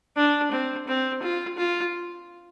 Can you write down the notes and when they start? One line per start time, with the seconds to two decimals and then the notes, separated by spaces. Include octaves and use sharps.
0.16 D4
0.52 C4
0.87 C4
1.22 F4
1.57 F4